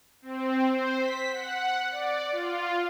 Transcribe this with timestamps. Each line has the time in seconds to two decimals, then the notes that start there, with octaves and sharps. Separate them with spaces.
0.22 C4
0.69 C5
0.97 B6
1.31 F#5
1.91 D5
2.32 F4